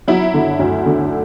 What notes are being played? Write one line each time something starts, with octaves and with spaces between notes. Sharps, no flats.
F#3 E4
D3
D2
D3